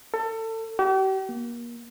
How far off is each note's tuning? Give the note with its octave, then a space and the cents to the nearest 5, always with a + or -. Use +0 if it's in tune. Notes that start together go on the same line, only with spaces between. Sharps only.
A4 +30
G4 -40
A#3 +30